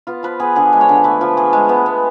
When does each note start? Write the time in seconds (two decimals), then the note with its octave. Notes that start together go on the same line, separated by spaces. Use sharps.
0.07 B3 F4
0.23 F3 B4
0.40 B3 G#4
0.56 D3 G#4
0.73 G#3
0.81 C#5
0.89 D3
1.04 A3 B4
1.21 F3
1.37 A3 G#4
1.53 G#3
1.69 B3
1.86 B3